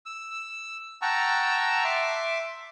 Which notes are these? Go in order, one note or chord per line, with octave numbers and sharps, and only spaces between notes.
E6
F#5 G5 A5 A#5 C#6 E6
E5 C6 D6